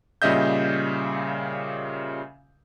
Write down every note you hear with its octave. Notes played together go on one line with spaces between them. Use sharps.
A#2 C#3 G3 D#5 E5 G6